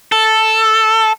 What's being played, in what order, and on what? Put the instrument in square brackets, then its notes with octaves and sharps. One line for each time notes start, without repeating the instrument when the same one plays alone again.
[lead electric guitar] A4